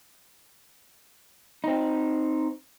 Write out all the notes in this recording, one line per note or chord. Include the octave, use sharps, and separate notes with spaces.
C4 D#4